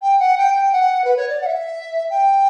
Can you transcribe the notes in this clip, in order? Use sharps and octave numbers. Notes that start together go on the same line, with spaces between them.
G5
F#5
G5
G5
F#5
B4
C#5
D5
F#5
E5
G5